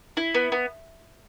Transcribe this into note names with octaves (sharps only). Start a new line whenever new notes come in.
E4
B3
B3